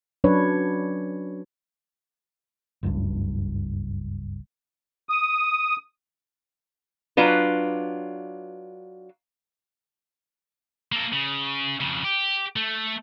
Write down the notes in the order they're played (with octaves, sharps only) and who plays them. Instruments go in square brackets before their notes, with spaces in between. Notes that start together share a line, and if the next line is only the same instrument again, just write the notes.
[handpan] F#3 C#4 D4 B4 C#5
[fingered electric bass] F#1 C#2 G2
[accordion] D#6
[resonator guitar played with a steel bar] F#3 D4 F4 B4
[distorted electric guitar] A#3 A4
C#3
F2 C#3
G4
A3